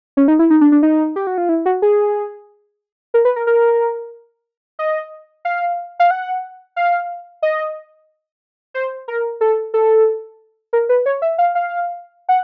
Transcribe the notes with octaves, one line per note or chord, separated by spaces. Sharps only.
C#4
D#4
E4
D#4
D4
D4
D#4
G4
F#4
F4
E4
F#4
G#4
A#4
B4
A#4
A#4
D#5
F5
F5
F#5
F5
D#5
C5
A#4
A4
A4
A#4
B4
C#5
E5
F5
F5
F#5